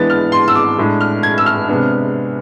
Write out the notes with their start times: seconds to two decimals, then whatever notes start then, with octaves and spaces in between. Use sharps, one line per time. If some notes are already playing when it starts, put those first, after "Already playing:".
Already playing: E3 G#3 B3 D4 A6
0.10 F6
0.32 C6
0.48 E6
0.55 D6
0.78 A2 G#3 D4
1.01 F6
1.23 G#6
1.38 E6
1.46 F6
1.68 C3 G#3 B3 D4